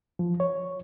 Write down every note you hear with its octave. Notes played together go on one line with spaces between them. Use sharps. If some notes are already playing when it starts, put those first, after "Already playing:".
F3
C#5